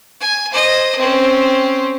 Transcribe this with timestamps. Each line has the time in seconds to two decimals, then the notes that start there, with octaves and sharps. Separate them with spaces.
0.20 G#5
0.51 C5 D#5
0.97 C4 C#4